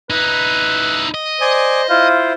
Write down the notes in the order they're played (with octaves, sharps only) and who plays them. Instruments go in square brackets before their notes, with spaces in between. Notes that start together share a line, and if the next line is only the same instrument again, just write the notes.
[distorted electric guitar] D#4 E4 [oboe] B4
[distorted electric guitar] D#5
[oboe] C5 [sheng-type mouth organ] D5 G#5 D#6
[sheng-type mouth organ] E4 F4 C5 [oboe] F5